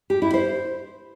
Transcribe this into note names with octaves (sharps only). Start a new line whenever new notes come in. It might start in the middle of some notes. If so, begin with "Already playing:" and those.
G4
E4
C5